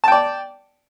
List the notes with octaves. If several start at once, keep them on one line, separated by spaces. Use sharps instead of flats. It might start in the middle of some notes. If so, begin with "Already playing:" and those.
D5 G5 A5